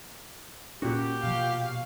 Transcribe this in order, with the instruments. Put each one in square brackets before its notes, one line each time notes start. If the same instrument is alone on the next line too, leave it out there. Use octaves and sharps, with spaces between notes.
[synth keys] A#2 F#4 [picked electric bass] C#4 [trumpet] G4
[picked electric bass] B2 F3 [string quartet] F5